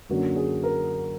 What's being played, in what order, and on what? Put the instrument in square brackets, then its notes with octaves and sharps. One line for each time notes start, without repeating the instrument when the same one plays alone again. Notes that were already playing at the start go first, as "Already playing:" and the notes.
[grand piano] F#2 D3 F#3 A#3 F#4
G#4
A#4